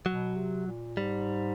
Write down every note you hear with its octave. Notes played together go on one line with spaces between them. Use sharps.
B2 F#3
C3
A#2
G#2 G3